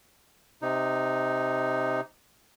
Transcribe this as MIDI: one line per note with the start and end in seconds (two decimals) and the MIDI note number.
0.62 2.01 48
0.62 2.01 63